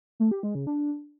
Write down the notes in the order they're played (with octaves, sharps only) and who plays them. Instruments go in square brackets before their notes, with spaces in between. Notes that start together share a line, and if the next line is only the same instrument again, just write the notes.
[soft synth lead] A3
G4
G#3
C#3
D4